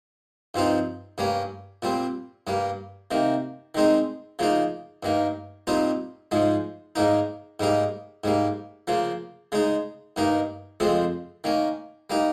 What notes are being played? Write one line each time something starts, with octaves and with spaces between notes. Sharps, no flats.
G2 F3 C4 D#4
G2 G3 A#3 C#4
A#2 G3 C4
G2 G3 A#3
C3 D#3 A#3
D#3 G#3 C4 D#4
C#3 F3 A#3 D#4
G2 D#3 A#3
A#2 G3 C4 D#4
G#2 F3 G#3
G#2 D#3 A#3 D#4
G#2 G3 A#3 D#4
G#2 G3 A#3
C#3 F3 A#3
C#3 G#3 D#4
G2 D#3 A#3 D#4
F2 C#3 F3 G#3 C4
D#3 A#3 C#4
G3 A#3 D#4